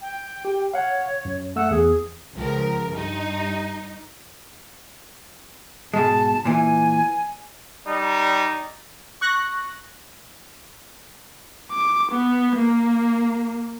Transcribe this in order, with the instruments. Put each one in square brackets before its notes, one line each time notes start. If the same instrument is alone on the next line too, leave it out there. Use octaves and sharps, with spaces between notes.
[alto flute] G5
[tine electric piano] G4
[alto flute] C#5 [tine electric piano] F5 F#5
[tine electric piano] F#2
[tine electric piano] A3 E6 [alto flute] F#5
[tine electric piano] E2 [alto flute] G#4
[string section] C#2 F3 A#4
G2 D#4
[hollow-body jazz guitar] G#2 B2 G#3 [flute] A5
[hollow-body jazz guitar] A#2 E3 [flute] G#5
[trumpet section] G3 D#4
[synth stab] C#6 F#6 A#6
[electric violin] D6
B3
A#3